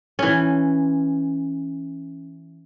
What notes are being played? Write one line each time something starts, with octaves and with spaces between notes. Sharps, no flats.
E3 C#4